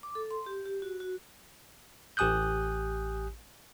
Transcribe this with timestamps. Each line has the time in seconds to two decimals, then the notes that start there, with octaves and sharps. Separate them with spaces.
0.03 D6
0.15 A4
0.31 C6
0.46 G4
0.66 G4
0.82 F#4
1.00 F#4
2.17 A1 G4 G#5 D#6 F#6 G6